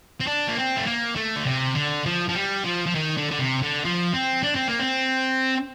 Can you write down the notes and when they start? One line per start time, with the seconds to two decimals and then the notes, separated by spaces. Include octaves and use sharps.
0.21 C4
0.27 D4
0.48 A#3
0.57 C4
0.77 A3
0.86 A#3
1.16 A3
1.36 D3
1.45 C3
1.75 D3
2.06 F3
2.28 F3
2.35 G3
2.64 F3
2.87 F3
2.95 D#3
3.18 D3
3.31 D3
3.39 C3
3.62 D3
3.84 F3
4.14 C4
4.44 D4
4.56 C4
4.68 A#3
4.80 C4